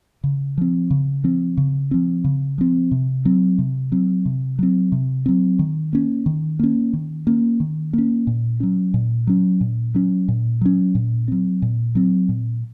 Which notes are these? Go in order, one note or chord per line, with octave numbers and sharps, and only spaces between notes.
C#3
F3 C4
C#3
F3 C4
C#3
F3 C4
C#3
F3 C4
C3
F#3 C4
C3
F#3 C4
C3
F#3 C4
C3
F#3 C4
D#3
A#3 C#4
D#3
A#3 C#4
D#3
A#3 C#4
D#3
A#3 C#4
A#2
F#3 C#4
A#2
F#3 C#4
A#2
F#3 C#4
A#2
F#3 C#4
A#2
F#3 C4
A#2
F#3 C4
A#2